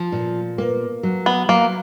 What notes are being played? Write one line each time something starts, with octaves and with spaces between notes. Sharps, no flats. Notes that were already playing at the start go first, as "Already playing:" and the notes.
Already playing: F3
A#2
A#3
F#3
B3
F#3 A#3